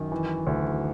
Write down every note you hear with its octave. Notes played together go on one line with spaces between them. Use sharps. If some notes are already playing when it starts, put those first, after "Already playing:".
Already playing: F#2 D#3
E3
D2